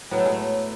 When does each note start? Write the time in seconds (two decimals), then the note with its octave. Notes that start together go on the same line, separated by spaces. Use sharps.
0.11 A2 F#3 B3
0.18 A3
0.25 G#3
0.32 A3